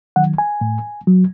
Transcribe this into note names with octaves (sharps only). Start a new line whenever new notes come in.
D#3 F#3 F#5
G#5
A2
F#3